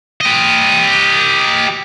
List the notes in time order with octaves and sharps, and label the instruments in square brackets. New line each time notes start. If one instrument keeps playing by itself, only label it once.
[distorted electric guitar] G4 D#5